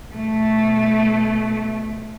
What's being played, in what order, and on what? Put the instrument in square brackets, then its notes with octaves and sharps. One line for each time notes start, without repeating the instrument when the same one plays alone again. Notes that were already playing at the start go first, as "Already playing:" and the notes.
[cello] B2 A3